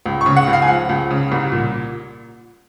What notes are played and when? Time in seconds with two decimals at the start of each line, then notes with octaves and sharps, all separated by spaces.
0.06 C#2
0.21 C#3 C#6
0.36 F#5
0.47 C#2
0.53 F5
0.62 G#5
0.68 F3 F#5
0.89 C#2
1.11 C#3
1.32 C2
1.52 A#2